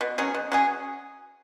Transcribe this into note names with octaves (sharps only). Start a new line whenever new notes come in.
B2
F#3 C#4 G#4
B2
F#3 C#4 G#4